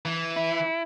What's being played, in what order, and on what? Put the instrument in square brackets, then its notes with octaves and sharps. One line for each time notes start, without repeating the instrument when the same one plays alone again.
[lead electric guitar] E3
[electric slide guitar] E4